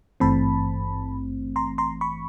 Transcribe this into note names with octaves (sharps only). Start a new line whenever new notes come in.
G#1 G2 E3 A3 C4 A5 B5
A#5 C6
A#5 C6
B5 C#6